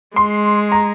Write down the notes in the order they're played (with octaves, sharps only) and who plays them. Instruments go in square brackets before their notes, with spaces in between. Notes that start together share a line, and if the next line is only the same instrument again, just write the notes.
[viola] G#3 [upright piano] C6
[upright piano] A#5